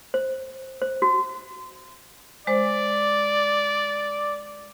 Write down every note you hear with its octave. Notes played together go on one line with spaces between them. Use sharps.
C5
C5
F#4
G#3 C5 D5